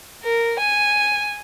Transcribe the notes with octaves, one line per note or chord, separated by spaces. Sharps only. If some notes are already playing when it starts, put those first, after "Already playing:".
A#4
G#5